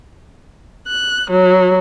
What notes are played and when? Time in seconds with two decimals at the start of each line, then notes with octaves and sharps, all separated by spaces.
0.87 F#6
1.30 F#3